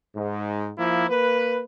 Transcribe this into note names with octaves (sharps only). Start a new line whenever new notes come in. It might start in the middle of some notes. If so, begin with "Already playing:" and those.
G#2
F3 A#3 E4
A#3 B4